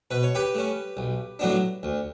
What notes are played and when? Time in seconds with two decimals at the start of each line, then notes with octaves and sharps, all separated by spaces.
0.11 B2 B4
0.23 C#5
0.35 G4 B4
0.54 A3 C#4
0.97 B1
1.39 A2 F#3 B3 D4
1.83 D2